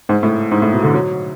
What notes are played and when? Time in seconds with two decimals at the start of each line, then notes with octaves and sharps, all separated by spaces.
0.09 G#2
0.23 A2
0.51 G#2
0.62 A2
0.72 B2
0.83 D3
0.94 F#3